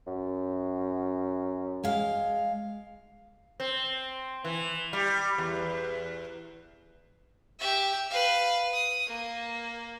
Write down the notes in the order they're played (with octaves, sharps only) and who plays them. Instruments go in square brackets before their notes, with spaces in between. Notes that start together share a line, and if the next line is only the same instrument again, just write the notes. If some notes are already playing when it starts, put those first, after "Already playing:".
[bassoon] F#2
[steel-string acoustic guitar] G#3 F5
[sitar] C4
E3
G3
E2
[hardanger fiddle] G4 E5
B4 F5
D#6
A#3